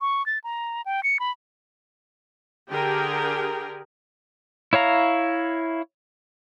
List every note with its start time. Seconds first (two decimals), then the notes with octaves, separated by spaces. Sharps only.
0.01 C#6
0.26 A6
0.44 A#5
0.86 G5
1.03 C#7
1.20 B5
2.71 D3 G4 G#4 A#4 G5
4.73 E4 C#5 F5 A#5